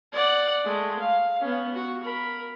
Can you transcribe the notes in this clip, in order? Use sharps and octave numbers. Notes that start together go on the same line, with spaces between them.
D5 F#5
G#3 A3
F5
B3 C#4
F#4
A#4 B5